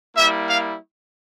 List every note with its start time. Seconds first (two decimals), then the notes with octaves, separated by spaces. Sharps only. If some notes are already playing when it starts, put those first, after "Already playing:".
0.16 G3 A#3 E4 E5
0.46 F5